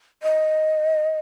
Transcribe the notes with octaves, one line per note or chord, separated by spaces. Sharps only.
D#5